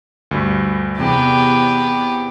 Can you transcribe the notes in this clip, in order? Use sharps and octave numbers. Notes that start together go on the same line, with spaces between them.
D2 G2
E2 C3 B3 G4